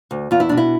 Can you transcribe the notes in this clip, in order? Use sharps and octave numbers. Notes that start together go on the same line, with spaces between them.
D2
E2 F4
E4
B2 D4
E4